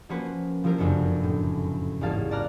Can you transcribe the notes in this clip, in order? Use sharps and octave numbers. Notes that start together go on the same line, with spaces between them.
F3 A#3 C#4 F#4 B4 C5
F3 G3 E4 A#4 C5
F1 F#2 C#3 B3 D4
A2
A1 E2 G#2 A#3 F5 A5
D5 A5 A#5 F6 F#6